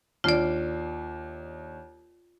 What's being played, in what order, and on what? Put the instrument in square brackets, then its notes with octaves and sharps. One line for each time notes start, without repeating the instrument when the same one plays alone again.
[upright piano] D#2 D4 C7 [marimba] F4 D5